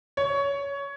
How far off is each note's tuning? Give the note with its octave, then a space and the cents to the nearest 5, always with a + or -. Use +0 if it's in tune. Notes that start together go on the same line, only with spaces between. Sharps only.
C#5 +15